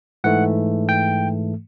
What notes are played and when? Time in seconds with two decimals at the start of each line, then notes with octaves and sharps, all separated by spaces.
0.24 G#2 E3 A3 F#5
0.89 G5